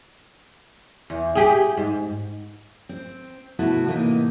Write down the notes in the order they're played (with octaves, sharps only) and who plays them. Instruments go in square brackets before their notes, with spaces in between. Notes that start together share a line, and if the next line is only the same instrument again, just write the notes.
[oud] E2
G4 G#4
G#2
[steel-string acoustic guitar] C4
C3 A3 B3 E4 F#4 A4
A2 C3 E3 A3 A#3 D#4